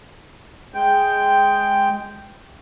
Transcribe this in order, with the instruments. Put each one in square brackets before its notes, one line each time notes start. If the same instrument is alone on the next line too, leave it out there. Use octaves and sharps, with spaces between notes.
[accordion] G#3 G5